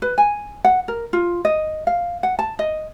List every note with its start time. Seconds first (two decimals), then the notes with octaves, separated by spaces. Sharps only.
0.02 B4
0.18 G#5
0.65 F#5
0.88 A#4
1.13 F4
1.45 D#5
1.87 F5
2.23 F#5
2.39 A5
2.59 D#5